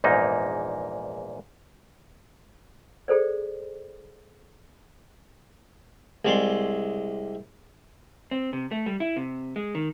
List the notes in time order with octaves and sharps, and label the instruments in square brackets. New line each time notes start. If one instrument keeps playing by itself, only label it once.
[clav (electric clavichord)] A#1 E2 G#2 A#3 D#4
[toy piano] G#4 A4 C5 D5
[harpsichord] C2 G#3 D5 C6
[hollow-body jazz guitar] C4
C3
A3
G3
E4
C3
G#3
D#3